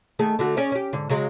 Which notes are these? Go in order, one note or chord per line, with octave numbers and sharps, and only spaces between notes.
D#3 A3 G#4
D3 A3 F#4
C#4 G#4 D5
C#4 G4
G#2 D3
C#3 F#3 G#3